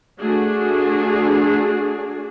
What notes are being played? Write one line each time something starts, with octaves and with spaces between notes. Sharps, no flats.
A3 D4 F#4 G#4